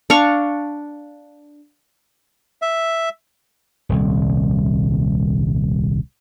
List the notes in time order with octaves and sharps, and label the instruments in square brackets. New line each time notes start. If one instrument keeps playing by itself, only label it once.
[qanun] D4 F5 C#6
[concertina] E5
[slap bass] D#1 C2